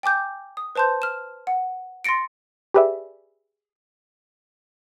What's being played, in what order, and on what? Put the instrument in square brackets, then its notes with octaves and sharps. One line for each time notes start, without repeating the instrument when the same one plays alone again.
[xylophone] G5 G#5 D6 G6
D#6
B4 C5 A5 C6 G6
F6 E7
F#5
C6 A6 A#6 C#7 D7
[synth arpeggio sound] G4 G#4 B4 D5 E5